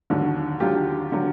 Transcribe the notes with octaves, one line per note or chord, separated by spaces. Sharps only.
D#2 D3 F#3
D#2 D3 F#3 F4 G4
D3 F#3